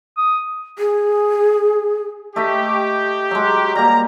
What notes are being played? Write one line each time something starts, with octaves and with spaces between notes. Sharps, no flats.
D#6
G#4
A3 G4 D#5 B5
F#3 G#3
G3 A#3 A#5